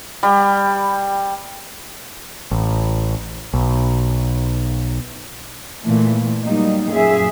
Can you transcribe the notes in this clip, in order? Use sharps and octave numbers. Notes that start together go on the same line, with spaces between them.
G3
A1
B1
A#2 E3 A3
F#3 G3 A#3 D#4
F#2 A#2 G#4 E5